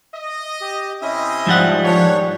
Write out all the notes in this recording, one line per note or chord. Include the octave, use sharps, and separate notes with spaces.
D#5
G4
C3 C4 C#4 E4 D#5 E5
G#2 F3 G3 F#5
D#3 D4 C#5